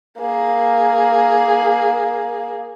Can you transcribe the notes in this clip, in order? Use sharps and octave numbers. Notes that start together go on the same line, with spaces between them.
A#3 G#4